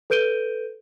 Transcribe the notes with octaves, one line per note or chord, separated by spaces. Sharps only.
A4 B4 G6 D7 D#7 G7